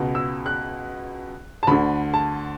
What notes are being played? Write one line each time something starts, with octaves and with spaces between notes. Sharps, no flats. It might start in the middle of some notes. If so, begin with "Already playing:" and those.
Already playing: C#2 B2
E6
F#6
A5
D2 D3 B5
A5